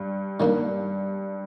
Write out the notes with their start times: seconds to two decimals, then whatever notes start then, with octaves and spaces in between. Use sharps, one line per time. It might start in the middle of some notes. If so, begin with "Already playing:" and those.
Already playing: G2
0.39 G2 D#3 F#3 A#3 D4